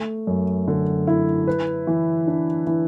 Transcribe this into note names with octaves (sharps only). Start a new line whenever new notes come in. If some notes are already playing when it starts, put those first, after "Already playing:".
Already playing: A3
F#2
D3
E4
B4
E3
D4
E3